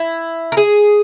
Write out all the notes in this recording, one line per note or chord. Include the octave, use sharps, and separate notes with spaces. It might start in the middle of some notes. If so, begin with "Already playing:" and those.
Already playing: E4
A#4
G#4